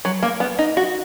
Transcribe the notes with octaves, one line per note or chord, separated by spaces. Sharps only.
F#3
A#3
B3
D#4
F#4